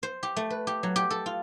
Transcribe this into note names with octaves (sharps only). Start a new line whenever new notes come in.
C5
G4
A3
B4
G4
F#3
G4
A4
F4